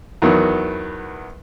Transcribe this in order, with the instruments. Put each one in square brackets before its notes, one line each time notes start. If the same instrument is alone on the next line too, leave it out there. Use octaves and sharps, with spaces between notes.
[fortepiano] E2 D#3 F#3 B3